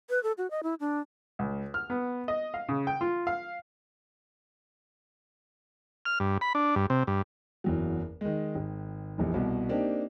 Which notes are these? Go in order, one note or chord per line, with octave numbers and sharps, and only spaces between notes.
B4
A4
F#4
D#5
E4
D4
C#2
F6
B3
D#5
F5
C#3
G5
F4
F5
F6
G2
B5
D4
G2
C3
G2
F#1 E2 F#3
D#3 G#3
G#1
F1 A#1 E2
C2 B2
A#3 C4 D4 D#4 G4